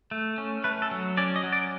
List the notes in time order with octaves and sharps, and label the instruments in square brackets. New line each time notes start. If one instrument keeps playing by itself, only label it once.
[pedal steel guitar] A3
C#4
A3 B4
A4
F#3
C#4 D5
D#5
F#3
D5